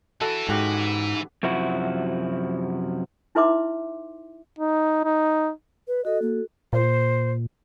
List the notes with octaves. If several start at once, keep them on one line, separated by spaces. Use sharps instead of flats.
E3 E4 F#4 A4 E5
G#2 C#4 F#4 G4
F#2 C3 F3 E4 F#4
D#4 E4 B4 E5 C6 D6
D#4
D#4
B4
F#4 A4 D#5
A#3
A#2 C5